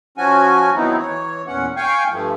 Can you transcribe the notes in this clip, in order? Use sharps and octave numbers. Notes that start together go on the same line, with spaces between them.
F3 C#4 F#4 G#5
D#3 F#3 B3 C4 D#4 E4
E3 C#5
E2 A#2 C#4 F#5
F5 G5 G#5 C#6
G2 F3 A3